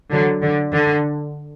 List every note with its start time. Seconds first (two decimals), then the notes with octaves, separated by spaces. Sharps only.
0.11 D3 F#3
0.43 D3
0.73 D3